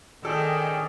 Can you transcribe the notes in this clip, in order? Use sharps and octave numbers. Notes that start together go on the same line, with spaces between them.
D#3 C#4 G#4 A4 D5 G5